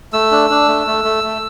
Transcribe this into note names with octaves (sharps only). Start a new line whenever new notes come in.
A3 E6
D4
D4
A3
A3
A3
A3